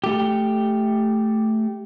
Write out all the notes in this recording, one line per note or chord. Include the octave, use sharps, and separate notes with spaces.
A3 G4